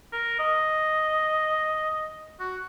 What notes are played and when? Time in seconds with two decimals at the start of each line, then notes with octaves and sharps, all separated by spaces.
0.13 A#4
0.39 D#5
2.40 F#4